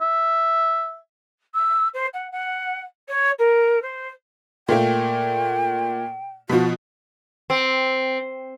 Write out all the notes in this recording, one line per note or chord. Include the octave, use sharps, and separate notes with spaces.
E5
E6
C5
F#5
F#5
C#5
A#4
C5
A#2 A3 A#3 G5
B2 F3 F#4
C4